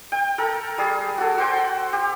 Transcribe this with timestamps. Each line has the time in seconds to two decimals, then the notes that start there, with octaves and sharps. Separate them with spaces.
0.12 G5
0.38 A4 A#4
0.78 G3 G#4
1.18 F#4 A4
1.38 F#4 C5 G5
1.93 G4